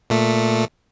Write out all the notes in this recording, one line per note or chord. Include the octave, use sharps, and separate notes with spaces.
A#2 A3